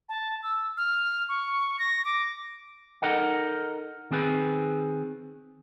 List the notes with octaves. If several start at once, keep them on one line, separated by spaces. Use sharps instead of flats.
A5
E6
F6
C#6
A#6
D6
D#4 A4 A#4 D#5 F#5
D#3 C4 G#4 B4